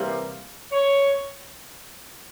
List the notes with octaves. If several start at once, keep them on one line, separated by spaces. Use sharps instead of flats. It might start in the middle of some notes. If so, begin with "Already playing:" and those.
Already playing: C3 E3 G3 A#3
C#5